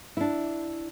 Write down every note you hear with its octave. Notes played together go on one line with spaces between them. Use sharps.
D4 E4